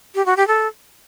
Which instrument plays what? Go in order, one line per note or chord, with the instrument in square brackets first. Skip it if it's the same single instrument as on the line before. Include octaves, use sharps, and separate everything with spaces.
[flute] G4
F#4
G4
A4